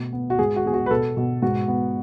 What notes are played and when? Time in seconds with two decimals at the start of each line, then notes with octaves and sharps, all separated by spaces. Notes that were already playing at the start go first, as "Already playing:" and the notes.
Already playing: B2 A3
0.13 B3
0.30 F#4
0.39 G#2 G#4
0.56 F#4
0.64 B3 G#4
0.74 F#4
0.86 B4
0.91 B2 A4
1.17 B2
1.42 G#2 F#4
1.68 B3